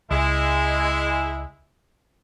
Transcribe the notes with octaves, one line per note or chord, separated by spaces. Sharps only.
C#2 G#3 E4